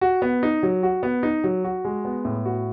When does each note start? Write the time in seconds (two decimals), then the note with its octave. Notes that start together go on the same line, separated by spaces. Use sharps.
0.01 F#4
0.22 B3
0.43 D#4
0.63 F#3
0.83 F#4
1.03 B3
1.23 D#4
1.44 F#3
1.64 F#4
1.85 G#3
2.05 B3
2.25 A2
2.45 F#4